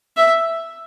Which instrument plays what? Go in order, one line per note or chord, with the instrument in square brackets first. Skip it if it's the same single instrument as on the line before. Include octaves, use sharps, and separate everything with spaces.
[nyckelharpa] E5